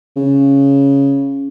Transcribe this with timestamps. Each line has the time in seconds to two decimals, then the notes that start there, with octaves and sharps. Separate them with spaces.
0.17 C#3